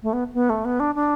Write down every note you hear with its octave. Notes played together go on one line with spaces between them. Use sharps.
A3
B3
B3
A3
B3
D4
D4